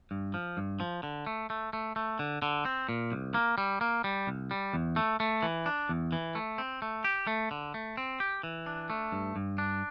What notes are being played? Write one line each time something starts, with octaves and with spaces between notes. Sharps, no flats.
G2
F3
G2
F3
D3
A3
A3
A3
A3
D3
D3
C4
A#2
C2
A#3
G3
A#3
G3
C2
G3
E2
A3
A3
E3
D4
E2
E3
A3
C4
A3
G4
A3
D3
A3
C4
G4
E3
D4
A3
G2
G2
D4